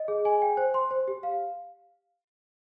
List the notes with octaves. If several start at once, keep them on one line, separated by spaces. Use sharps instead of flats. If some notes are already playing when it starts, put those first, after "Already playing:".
Already playing: D#5
G#4
G#5
G5
C5
C6
C5
G4
F5